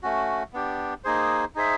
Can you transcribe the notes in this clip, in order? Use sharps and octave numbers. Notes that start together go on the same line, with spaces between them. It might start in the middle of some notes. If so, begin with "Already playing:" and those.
A3 C#4 F#4
B3 D4 G4
A#3 D#4 G#4 C5
D#4 G#4 C5 E5